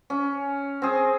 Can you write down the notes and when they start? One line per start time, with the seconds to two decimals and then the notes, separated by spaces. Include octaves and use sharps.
0.10 C#4
0.82 C4 G#4